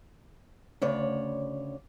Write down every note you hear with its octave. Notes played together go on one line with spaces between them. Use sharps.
D2 C#3 C#5 D5